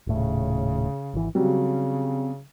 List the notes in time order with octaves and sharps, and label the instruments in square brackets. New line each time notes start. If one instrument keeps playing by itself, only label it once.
[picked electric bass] D#1 A2 [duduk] C#3
[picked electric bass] G#1 E3
[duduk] C#3 [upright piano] F#3 G3 [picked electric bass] C4